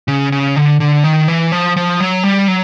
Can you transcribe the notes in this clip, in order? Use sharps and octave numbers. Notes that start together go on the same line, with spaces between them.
C#3
C#3
D3
D3
D#3
E3
F3
F3
F#3
G3
F#3